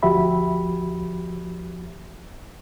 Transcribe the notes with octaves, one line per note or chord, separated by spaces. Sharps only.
D2 F3 F#4 G4 E5 B5